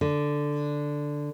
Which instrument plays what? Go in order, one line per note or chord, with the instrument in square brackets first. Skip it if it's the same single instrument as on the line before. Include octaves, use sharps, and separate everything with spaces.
[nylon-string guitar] D3